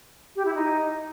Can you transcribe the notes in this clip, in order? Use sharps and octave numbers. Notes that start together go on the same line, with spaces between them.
G4
E4
D#4